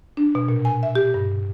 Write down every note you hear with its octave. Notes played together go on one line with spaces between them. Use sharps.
D4
B2
A#2
G#5
E5
G4
G2